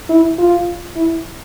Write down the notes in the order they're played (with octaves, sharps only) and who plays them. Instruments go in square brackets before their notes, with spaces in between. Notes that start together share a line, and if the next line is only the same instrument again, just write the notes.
[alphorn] E4
F4
E4